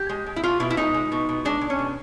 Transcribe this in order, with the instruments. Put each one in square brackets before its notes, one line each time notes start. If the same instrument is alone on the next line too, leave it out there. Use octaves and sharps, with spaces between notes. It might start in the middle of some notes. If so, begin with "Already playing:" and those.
Already playing: [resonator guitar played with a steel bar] G4
G#3
G#3
E4
B2 F4
B2 E4
E4
G#3 D#4
G#3
B2
B2
G#3 D4
G#3
C#4
B2